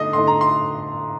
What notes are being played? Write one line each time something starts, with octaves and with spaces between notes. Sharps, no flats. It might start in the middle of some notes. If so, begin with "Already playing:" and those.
Already playing: D3 A3 D#4 D#5
D3 A3 D#4 C6
A#5
C6